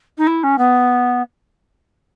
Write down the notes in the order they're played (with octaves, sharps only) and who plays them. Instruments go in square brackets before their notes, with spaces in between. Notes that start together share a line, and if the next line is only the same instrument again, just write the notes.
[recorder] D#4
E4
C#4
B3